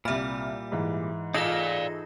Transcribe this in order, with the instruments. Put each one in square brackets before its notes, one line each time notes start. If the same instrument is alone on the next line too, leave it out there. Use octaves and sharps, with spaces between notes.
[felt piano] C2 F6 [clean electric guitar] A#2 G3 [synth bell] E5 B5
[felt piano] G#2 E3
[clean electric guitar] D#4 G#4 A4 [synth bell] F4 A#6 [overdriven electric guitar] D5 F5